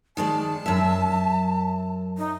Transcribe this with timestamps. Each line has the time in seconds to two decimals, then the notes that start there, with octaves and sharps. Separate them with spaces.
0.17 D#3 G#3 D5 A5
0.66 F#2 E5
2.18 D#4